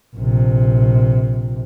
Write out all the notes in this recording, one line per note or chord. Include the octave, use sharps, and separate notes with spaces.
A#1 C3